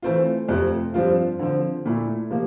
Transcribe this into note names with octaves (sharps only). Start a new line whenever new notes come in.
E3 A3 C4 F4
F2 C3 F3 A3 C4
G2 F3 C4 F4
D3 F3 C4
A#2 A3 E4
C3 F3 A#3